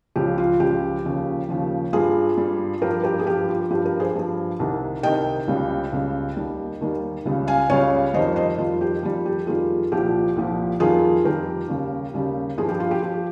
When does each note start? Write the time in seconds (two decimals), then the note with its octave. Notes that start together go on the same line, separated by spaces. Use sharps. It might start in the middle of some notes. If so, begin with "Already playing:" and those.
0.16 C#2 C#3 F3 G4
0.38 F4
0.60 C#2 C#3 F3 G4
1.04 D#2 C#3 F3
1.49 D#2 C#3 F3
1.93 G2 G3 F4 G#4
2.37 G2 G3
2.82 G2 F3 G4 A#4
3.03 G4 A#4
3.19 G#4
3.26 G2 F3 G4
3.49 F4
3.70 G2 F3 G4
3.85 G4 A#4
4.00 G#4 C5
4.15 G2 F3
4.60 C2 C3 D#3
5.03 C2 C3 D#3 D#5 G5
5.48 C#2 C#3 G3
5.93 C#2 C#3 G3
6.36 D#2 D#3 G3
6.81 D#2 D#3 G3
7.25 C#2 C#3 G3
7.47 F5 G#5
7.69 C#2 C#3 G3 C#5 F5
8.14 F2 D#3 G3 C5 D#5
8.36 C5 D#5
8.58 F2 D#3 G3 F4
8.81 G4
9.03 F2 D#3 G3 F4
9.26 G4
9.47 F2 D#3 G3 F4 G#4
9.92 C2 A#2 F3 G4
10.36 C2 A#2 F3
10.80 F2 D#3 G3 F4 G#4
11.24 F2 D#3 G3 G4 A#4
11.68 D#2 C#3 G3
12.14 D#2 C#3 G3
12.58 G2 F3 F4 G#4
12.69 G4
12.80 F4
12.91 G4
13.02 F3 G4